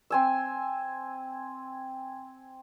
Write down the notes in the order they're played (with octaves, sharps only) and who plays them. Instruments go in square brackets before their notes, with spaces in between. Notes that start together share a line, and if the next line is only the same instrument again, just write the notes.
[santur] C4 G#5 E6